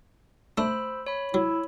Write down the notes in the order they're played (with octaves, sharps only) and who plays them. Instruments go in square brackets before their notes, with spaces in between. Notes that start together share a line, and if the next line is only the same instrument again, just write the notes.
[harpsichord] A3 D4 [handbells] C5 B5 E6
[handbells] C#5 B5
[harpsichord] F#3 [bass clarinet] E4